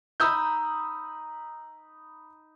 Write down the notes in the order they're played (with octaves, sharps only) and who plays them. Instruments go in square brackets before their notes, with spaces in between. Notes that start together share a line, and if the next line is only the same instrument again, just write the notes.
[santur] D#4 B5 [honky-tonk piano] D#6 E6 G6